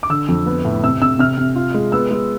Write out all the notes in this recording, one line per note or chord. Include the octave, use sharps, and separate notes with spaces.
D6
D3 E6
F2
B3
A2
C3 E6
C3 E6
C3 F6
C3
F4
G#3
B3 E6
G#3